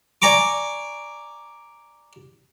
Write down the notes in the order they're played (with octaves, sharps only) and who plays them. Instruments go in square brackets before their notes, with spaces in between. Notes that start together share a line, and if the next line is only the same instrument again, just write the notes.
[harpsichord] D5 G#5 A#5 C#6 D6